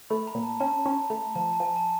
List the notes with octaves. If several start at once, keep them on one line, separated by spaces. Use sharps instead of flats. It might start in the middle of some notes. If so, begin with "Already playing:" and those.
A3 B5
A#5
A#2
A5
C#4 A5
C#4 A#5
A3 A#5
F3 A5
A5
F3 G#5
A5